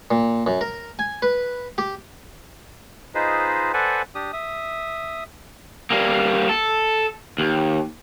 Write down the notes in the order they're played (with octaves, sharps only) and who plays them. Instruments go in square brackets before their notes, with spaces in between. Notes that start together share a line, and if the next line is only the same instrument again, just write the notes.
[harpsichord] A#2
F#2
A#4
G#5
B4
G4
[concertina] D#4 F4 G#4 B4 C5 D#5
A4 B4 C5 D5 F#5 G#5
D4 G4 D#6
E5 D#6
[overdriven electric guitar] G3 A#3
A4
D#2